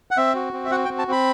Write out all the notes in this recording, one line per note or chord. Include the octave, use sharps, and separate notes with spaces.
F#5
C4 E5
F#4
C4
E5
F#4 F#5
G5
C4
A5
C4 B5